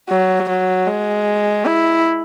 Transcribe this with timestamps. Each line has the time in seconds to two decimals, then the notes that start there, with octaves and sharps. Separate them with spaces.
0.09 F#3
0.49 F#3
0.87 G#3
1.66 E4